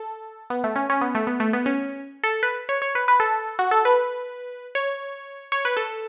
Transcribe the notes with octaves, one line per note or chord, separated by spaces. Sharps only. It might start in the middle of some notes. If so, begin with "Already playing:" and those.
Already playing: A4
B3
A3
C#4
C#4
B3
A3
B3
A3
B3
C#4
A4
B4
C#5
C#5
B4
B4
A4
F#4
A4
B4
C#5
C#5
B4
A4